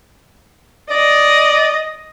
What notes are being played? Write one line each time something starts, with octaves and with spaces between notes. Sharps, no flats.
D5 D#5